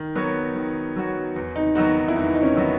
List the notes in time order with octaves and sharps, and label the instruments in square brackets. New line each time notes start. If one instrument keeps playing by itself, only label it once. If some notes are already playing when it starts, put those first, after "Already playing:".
Already playing: [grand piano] D#3 [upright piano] A#4
[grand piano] F#3 B3 F#4 C#5 [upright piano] A#4
[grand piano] D#3
F#3 B3 F#4 C#5
E2
[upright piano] D#4
[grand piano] D#3 F#3 B3 F#4 [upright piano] D#4
[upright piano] E4
[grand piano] E2 [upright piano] D#4
[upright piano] D#4
C#4
[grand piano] D#3 F#3 B3 F#4